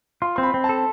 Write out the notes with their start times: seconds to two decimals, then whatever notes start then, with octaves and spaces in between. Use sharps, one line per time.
0.22 F4 C6
0.36 C4 C6
0.43 B5
0.54 C4
0.64 A5
0.69 A4